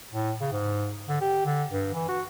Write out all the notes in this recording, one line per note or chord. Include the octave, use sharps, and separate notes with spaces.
A2
C#3
G#2
D3
G4
D3
G2
E3
F#4